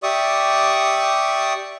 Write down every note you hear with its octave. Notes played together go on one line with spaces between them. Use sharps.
G4 D5 E5 C#6 D#6